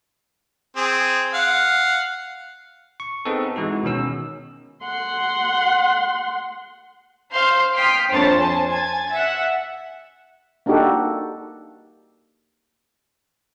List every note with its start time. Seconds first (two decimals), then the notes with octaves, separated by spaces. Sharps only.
0.77 C4 G#4
1.34 F5 F#5
3.00 C#6
3.25 B3 C4 D#4 G#4 A4
3.56 E3 G#3 D#4 F#4
3.83 B2 D#3 C#4 E6
4.83 F#5 C6
7.32 C5 F5 C6 F6 G6 C7
7.76 G5 C6 D#6 F6 B6
8.11 A#1 F2 C5 C#5 A5 A6
8.40 C5 G#5 A5
8.72 G#5 G#6 A6
9.12 E5 F#5
10.66 A#3 D4 D#4 F#4 G4 A4